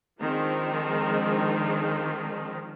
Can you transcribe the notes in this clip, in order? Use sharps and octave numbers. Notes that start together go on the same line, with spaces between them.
D#3 F3 G#3 C4 D4